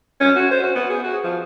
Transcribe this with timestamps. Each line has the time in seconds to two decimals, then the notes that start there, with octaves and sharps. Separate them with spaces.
0.21 C#4
0.36 F#4
0.51 C5
0.63 F#4
0.75 B3
0.90 G#4
1.04 F#4
1.24 F3